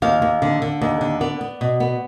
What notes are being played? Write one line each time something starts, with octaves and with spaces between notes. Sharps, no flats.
D#2 F5
D#2
D3
D3
D#2
D3
B3 D5
B3
B2
B3